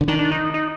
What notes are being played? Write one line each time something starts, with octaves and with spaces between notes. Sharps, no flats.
D3
D#3 D4
D4
D#4
D#4